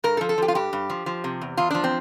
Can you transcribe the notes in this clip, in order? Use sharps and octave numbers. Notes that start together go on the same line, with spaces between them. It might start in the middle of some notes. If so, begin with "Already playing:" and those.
G2 A#4
A4
F3
A4
F3 G4
F4
G2 G4
G2
F3
F3
C3
E2
E2 F4
F3 D4
C4